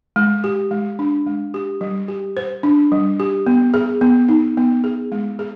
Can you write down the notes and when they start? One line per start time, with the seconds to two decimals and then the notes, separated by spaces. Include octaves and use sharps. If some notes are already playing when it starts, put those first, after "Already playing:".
0.16 G#3
0.44 G4
0.71 G#3
0.99 D4
1.26 G#3
1.54 G4
1.81 G3
2.08 G4
2.37 C5
2.63 D4
2.92 G3
3.20 G4
3.46 B3
3.74 G#4
4.01 B3
4.29 D#4
4.57 B3
4.84 G#4
5.12 G#3
5.39 G#4